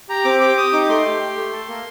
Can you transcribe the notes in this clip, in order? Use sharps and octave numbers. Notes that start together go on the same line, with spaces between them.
G4 A#5
C4 D6
G4 D6
G4 D#6
D#4 D6
A3 C6
G4
G4
A3
A4
A#3